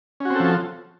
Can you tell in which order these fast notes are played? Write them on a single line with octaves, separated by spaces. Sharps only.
C#4 F#4 C4 A4 F3